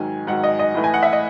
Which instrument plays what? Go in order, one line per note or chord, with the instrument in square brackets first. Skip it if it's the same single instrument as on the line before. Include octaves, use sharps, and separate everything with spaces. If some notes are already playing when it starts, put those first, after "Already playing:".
Already playing: [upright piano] G#2 D#3 F#3 G#5
G#2 D#3 F#3 F#5
D#5
D#5
A2 E3 A3
G#5
F#5
E5
D#5